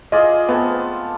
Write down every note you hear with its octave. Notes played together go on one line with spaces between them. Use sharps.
F4 G#4 D5 D#5
G#3 A3 B3 C4